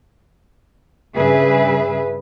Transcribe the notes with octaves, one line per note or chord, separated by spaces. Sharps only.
G2 C#3 G#4 B4 E5